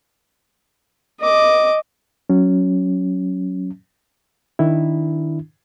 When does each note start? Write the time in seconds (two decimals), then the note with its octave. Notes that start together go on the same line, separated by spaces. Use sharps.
1.20 D#5 D6
2.30 F#3 C#4
4.59 D#3 D4 E4